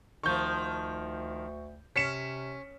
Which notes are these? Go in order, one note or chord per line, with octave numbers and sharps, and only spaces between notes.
D2 D#3 F3 C#6 G6
C3 C#4 B6 C#7 E7